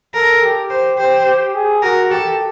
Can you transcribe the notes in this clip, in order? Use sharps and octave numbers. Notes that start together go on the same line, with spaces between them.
A4 A#4
G4
C5
G4 C5
G4
G#4
F#4 A#4
G4 A4